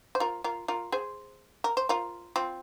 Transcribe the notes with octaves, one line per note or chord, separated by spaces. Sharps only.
C5
F4 A#4
F4 A#4
F4 A#4
G#4 C5
A#4
C5
F4 A#4
C4 F4